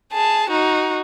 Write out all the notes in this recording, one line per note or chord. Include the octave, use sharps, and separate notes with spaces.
G#4 A5
D#4 F#4